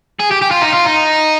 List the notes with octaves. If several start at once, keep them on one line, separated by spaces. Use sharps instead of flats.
G#4
G4
G4
F4
D#4
F4
D#4